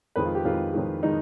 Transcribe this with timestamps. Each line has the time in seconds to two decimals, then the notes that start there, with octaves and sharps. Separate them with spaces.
0.16 F2 D#3 G#3 B4
0.25 F4
0.35 G4
0.44 F2 D#3 G#3 F4
0.73 F2 D#3 G#3
1.03 D#3 G#3 D#4